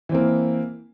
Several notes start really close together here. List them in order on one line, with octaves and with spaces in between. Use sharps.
E3 C4 A#3